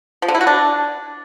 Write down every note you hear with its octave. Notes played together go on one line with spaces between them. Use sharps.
F3
D3
E4
F#4
D4